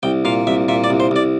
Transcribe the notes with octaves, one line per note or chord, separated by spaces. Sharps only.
C2 G5
A#2 F5
C2 E5
A#2 E5
D5
C2
C5
C2 D5